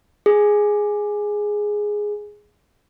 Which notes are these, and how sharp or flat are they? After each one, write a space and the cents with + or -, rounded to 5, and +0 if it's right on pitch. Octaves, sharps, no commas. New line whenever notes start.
G#4 +0